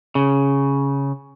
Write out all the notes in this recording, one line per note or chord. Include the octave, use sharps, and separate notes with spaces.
C#3